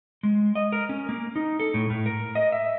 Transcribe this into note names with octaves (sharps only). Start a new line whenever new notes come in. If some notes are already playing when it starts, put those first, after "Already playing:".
G#3
D#5
A#4
C#4
A#3
D#4
A4
A2
A2
A#4
D#5
E5